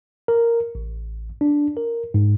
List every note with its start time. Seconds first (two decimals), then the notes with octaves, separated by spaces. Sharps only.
0.28 A#4
0.75 A1
1.41 D4
1.77 A#4
2.14 G#2